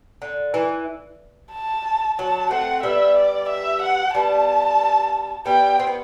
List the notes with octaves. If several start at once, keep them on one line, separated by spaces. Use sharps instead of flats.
D3
E3
A5
F#3 A5
A3 C4 F#5
G3 B3 E5
D5
E5
F#5
G3 B3 A5
G3 B3 G5
C4
B3